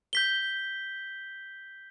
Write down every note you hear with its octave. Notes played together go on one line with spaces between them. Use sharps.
G6 B6 G7